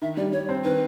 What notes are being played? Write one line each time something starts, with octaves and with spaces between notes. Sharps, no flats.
D#3 E5
G3 D5
G3 C#5
C4 C5
D#3 B4